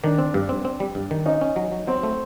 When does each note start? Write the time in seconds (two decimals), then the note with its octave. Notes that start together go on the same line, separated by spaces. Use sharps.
0.03 D#3 D4
0.18 C4
0.34 G2
0.49 C4
0.65 C4
0.80 G3
0.95 G2
1.11 D#3
1.26 C#4 D#4
1.41 C#4
1.56 F#3
1.72 F#3
1.87 F#3 C4
2.03 A3